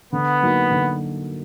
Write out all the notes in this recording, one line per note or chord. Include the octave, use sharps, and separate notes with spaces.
D3 B3
F#3 A#3 D#4 F#4
D3